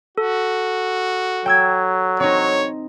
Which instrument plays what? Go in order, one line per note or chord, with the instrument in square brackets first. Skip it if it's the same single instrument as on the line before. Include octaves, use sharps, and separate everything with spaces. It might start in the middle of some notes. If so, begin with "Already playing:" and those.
[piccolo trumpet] F#4 [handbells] A4
[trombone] F#3 [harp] G5 E6 G#6
[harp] C4 D#4 [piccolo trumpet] C#5